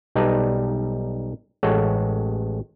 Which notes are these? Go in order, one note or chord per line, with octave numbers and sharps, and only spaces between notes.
B1 G3 D#4 B4 D5 A5
A1 G#3 A4 C#5 F#5